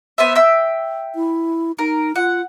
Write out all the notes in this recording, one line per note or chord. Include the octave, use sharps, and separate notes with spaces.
B3 C5 E5
E5 G5 E6
E4
D#4 A#4
F4 F#5